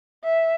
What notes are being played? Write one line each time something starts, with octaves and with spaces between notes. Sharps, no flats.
E5